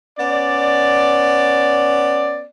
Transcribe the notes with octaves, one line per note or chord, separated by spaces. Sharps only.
B3 C#4 D5